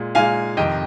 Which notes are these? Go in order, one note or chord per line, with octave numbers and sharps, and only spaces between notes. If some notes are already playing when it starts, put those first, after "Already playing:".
Already playing: A#2 G#3
A#2 G#3 F5 G#5
F2 C3 D#3 D#5 G5